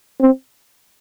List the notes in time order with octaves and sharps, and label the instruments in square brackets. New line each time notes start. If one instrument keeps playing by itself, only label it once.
[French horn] C4